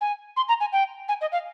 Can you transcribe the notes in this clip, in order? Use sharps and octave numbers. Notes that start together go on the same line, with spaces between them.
G#5
C6
A#5
G#5
G5
G#5
D#5
F5